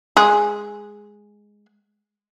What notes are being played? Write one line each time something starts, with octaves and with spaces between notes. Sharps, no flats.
G#3 G#4